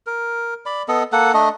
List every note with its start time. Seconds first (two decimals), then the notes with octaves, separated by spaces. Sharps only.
0.06 A#4
0.66 D5 B5
0.88 B3 A4 D#5
1.12 A#3 A4 F#5
1.34 A3 D4 D#5